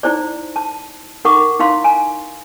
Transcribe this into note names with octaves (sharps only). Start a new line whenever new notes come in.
D#4 E4 C5 D5
A5
D#4 A#4 F#5 C#6 D6
D#4 E4 F5 C6
G#5 A#5